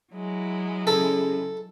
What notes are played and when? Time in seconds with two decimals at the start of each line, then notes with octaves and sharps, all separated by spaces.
0.13 F#3 G#3 E4
0.87 C#3 A4